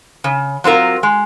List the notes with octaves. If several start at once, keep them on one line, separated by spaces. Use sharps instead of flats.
C#3
F#3 C4 F4 A#4
G#3